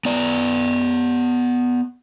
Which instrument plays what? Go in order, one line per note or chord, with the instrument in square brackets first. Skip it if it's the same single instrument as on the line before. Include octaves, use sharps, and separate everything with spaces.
[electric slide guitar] B3 D5